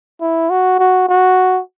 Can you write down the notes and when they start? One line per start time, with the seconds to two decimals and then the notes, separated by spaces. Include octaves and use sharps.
0.21 E4
0.50 F#4
0.79 F#4
1.09 F#4